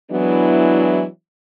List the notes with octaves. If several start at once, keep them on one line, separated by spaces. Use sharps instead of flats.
E3 F#3 G#3 B3 D4 E4